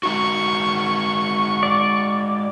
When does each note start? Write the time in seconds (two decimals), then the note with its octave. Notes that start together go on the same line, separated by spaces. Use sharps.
0.03 G#3 D#4 F#4 C#6
1.63 D5